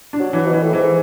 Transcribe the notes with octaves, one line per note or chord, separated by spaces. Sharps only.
D4
F#3
E3
B2
E3
A2
G#2 E3